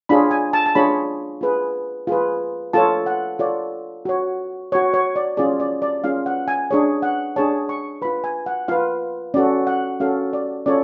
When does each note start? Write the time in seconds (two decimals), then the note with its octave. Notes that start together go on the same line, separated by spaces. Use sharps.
0.09 D4 F4 G#4 C#5 B5
0.31 G#5
0.53 A5
0.66 A5
0.75 D4 F4 G#4 C#5 B5
1.41 F4 G#4 B4
2.07 F4 G#4 B4
2.73 F4 A4 C#5 A5
3.06 F#5
3.39 F4 A4 C#5 D5
4.05 F#4 C#5
4.72 F#4 C#5
4.94 C#5
5.16 D5
5.37 C#4 F4 G#4 D5
5.60 D5
5.82 D5
6.04 C#4 F4 G#4 F5
6.26 F#5
6.48 G#5
6.71 D4 G#4 C#5
7.02 F#5
7.36 D4 G#4 C#5 A5
7.69 C#6
8.02 B4 B5
8.05 F4
8.24 G#5
8.46 F#5
8.68 F4 B4 F5
9.34 C#4 F#4 A4 D5
9.67 F#5
10.00 C#4 F#4 A4 F5
10.33 D5
10.66 C#4 F4 A4 C#5 D5